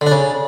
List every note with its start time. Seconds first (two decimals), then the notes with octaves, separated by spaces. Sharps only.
0.01 D3
0.07 D4
0.12 C#3